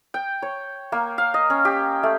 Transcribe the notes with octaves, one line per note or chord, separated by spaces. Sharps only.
G5
C#5
A#3
F5
D#5
C#4
G4
A3